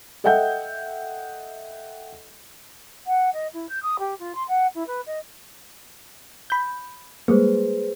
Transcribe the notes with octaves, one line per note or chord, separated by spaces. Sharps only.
A4 D#5 E5 F#5 G5 G6
F#5
D#5
E4
G6
D#6
G4
F4
C6
F#5
E4
B4
D#5
B5 G6
G3 G#3 A#3 G#4 B4 C5